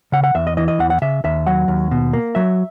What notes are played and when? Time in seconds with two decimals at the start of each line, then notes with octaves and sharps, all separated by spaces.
0.12 C#3 F#5
0.24 F#5
0.35 E2 E5
0.47 D#5
0.57 E3 D#5
0.68 D#5
0.79 E2 F#5
0.90 F#5
1.02 C#3 E5
1.24 D#2 E5
1.47 F#3 F#5
1.68 D#2
1.91 B2
2.13 A#3
2.35 F#3 E5